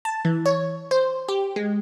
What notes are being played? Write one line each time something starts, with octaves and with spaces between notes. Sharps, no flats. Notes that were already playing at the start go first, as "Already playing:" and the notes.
A5
E3
C#5
C5
G4
G#3